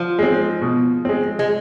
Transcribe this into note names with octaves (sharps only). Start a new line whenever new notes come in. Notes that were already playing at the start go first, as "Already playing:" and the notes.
Already playing: F3
G#3 C4
B2
G#3 C4
G#3